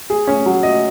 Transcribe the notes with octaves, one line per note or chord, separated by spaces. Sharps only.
G#4
C#4
F#3
D#5